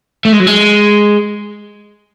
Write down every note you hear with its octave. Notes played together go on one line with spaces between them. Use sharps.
A3
G#3
F#3
G#3